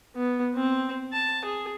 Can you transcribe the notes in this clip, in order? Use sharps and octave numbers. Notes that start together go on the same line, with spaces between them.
B3
C4
A5
G#4